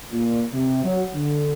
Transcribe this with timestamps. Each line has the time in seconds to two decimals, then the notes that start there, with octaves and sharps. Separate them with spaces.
0.12 A#2
0.53 C3
0.84 F#3
1.15 D3